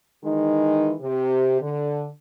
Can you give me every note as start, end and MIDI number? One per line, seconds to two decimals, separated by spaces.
0.24 0.93 51
0.24 0.93 52
0.24 0.93 56
0.24 0.93 63
1.01 1.61 48
1.01 1.61 67
1.62 2.08 50